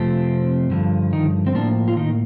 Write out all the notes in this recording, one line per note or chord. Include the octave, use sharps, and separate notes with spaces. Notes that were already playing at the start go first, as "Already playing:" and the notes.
Already playing: F2 C3 F3 A3 C4
G2 D3 F3
D#3 D#4
C4
A2 F3 A#3 D4
F4
D#3 D#4